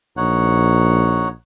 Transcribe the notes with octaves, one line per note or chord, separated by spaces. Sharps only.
A#1 D#4 C#5 F#5